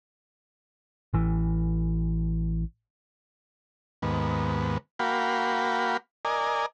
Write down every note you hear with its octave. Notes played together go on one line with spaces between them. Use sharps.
A1 E3
D#2 G#2 B3
A#3 F#4 F5 G5 B5
A#4 D5 D#5 G#5